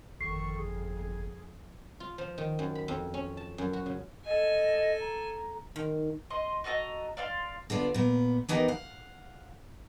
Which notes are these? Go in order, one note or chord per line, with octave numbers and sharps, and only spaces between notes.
G1 F2 D#3 A4 C#6 C7
G#4
F4
F3
D#3
F#2
B5
F2
C#4
A5
F#2
F#4
C#3
A4 D#5 G#5
A#5
D#3
D#5 C6
F#4 A4 D#5 A#5
D5 E5 F5 C6
D3 B3 F4 D5
A#2 B3
E3 B3 D#4 G4 A#4
F5 F#5